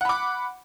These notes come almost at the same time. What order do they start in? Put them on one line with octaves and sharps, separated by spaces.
F#5 B5 D6